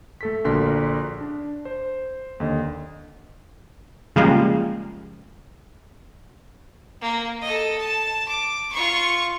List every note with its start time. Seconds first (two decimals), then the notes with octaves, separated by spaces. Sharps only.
0.21 A3 A4 B6
0.45 A#1 D3 F#4 A#4 C6 B6
1.21 D4
1.65 C5
2.40 D#2 D3 D#5
4.16 C#3 F3 G3 G#3 A#3
7.01 A#3
7.41 A4 D#5
7.78 A5
8.28 D6
8.72 F4 C#6